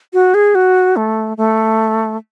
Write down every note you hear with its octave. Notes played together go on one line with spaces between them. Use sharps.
F#4
G#4
F#4
A3
A3